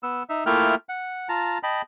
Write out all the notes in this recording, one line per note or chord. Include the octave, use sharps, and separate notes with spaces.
B3 E6
D#4 E5
A3 A#3 E4 F4 G5 F6
F#5
F4 A5 A#5
D#5 G5 A5 B5